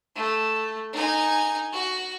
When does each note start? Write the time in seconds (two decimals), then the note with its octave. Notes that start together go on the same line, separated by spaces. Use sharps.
0.16 A3
0.93 D#4 G#5
1.72 F#4